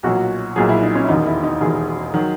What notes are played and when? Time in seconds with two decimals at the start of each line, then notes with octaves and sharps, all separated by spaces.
0.03 B1 A#2 F#3 F#4
0.56 B1 A#2 F#3 G#4
0.69 E4
0.82 D#4
0.95 C#4
1.04 E4
1.08 E1 D#2 D#3 D#4
1.26 E4
1.43 D#4
1.60 E1 D#2 D#3 G#4
2.14 D#3 F#3